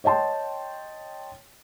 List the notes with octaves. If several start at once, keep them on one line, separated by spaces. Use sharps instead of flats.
C#5 D#5 G5 A5 C6